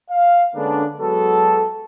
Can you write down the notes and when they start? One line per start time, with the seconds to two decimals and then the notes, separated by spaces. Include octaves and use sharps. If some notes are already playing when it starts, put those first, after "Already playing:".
0.10 F5
0.55 D3 G#3 A#3 B3 C#4 D4
1.00 F#3 G#3 B3 F#4 A4